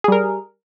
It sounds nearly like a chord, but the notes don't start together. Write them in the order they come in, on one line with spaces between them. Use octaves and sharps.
G#4 G3 A#4